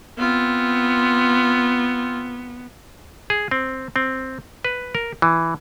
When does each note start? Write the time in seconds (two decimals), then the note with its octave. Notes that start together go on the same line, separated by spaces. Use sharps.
0.19 B3 C4 F4
3.30 G#4
3.51 C4
3.96 C4
4.65 B4
4.95 A#4
5.22 E3